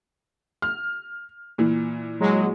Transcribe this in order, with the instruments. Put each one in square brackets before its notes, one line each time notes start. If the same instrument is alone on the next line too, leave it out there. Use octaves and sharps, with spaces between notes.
[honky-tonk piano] F6
A#2 E3
[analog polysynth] F#3 G#3